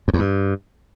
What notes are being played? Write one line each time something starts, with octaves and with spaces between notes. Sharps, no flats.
F#2
E2
G2